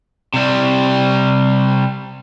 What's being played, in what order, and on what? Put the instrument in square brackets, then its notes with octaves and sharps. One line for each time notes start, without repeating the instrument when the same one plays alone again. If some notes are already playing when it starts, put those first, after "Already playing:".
[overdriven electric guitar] C3 G3